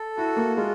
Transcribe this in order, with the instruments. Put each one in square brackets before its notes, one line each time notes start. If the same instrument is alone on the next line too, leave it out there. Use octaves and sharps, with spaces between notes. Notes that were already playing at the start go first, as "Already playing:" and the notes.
Already playing: [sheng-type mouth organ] A4
[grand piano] E4 [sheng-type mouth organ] F#4
[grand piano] A#3
[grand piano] G#3 [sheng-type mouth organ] F4